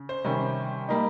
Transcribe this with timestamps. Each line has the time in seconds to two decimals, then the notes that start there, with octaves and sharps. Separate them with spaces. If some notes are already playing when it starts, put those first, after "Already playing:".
Already playing: C#3
0.09 C5
0.24 C3 D#3 G3 C#4
0.89 G3 A#3 D#4